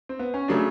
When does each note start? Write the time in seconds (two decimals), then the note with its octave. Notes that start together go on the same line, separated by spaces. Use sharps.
0.09 C4
0.19 B3
0.34 C#4
0.48 C#3 F#3 A3 D4